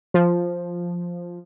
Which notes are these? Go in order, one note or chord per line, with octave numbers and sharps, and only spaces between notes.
F3